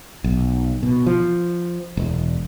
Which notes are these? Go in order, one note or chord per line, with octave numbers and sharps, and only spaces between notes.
B1
B2
F3
E1